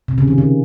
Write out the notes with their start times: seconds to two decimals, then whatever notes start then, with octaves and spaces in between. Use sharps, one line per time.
0.08 C3
0.18 C#3
0.28 D#3
0.38 C#3